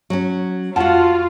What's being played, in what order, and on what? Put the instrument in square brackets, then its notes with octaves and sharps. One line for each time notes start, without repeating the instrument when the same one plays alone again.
[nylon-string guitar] F#3 C#4
[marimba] F2 F#5 [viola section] F4 [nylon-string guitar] F#4 A5